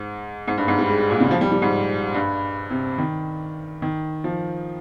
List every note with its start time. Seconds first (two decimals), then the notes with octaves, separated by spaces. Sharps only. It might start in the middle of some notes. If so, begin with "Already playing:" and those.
Already playing: G#2
0.48 G#2
0.58 G2
0.68 G#2
0.79 G3
0.89 G#3
0.99 G#3
1.10 A#2
1.20 C#3
1.31 F3
1.41 G3
1.52 G3
1.62 G#2
2.14 G2
2.70 C3
2.98 D#3
3.82 D#3
4.24 F3